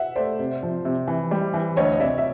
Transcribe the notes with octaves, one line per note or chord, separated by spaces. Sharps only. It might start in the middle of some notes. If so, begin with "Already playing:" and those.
Already playing: E5 F#5
A3 C5 D5
C3
F3
C3
E3
G3
E3
D2 C#5 D#5
D#5
C3 D5 E5
E5